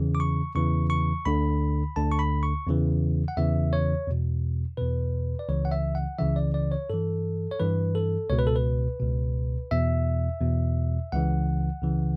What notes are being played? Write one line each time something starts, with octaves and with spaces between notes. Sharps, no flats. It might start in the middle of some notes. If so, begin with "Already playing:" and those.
Already playing: E2 C#3 E3
D6
C#6
E2 C#3 E3 C#6
C#6
D2 D3 B5
D2 D3 A5
C#6
B5
C#6
E2 C#3 E3
F#5
E2 C#3 E3 E5
C#5
E2 B2
E2 B2 B4
D5
C#2 C#3 E3 C#5
F#5
E5
F#5
C#2 C#3 E3 E5
D5
D5
C#5
G2 E3 A4
C#5
G2 E3 B4
A4
C#2 B2 C#5
B4
A4
B4
C#2 B2
E2 B2 E5
E2 B2
C#2 C#3 E3 F#5
C#2 C#3 E3